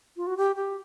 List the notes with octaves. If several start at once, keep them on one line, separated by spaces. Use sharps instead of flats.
F4
F#4
G4
G4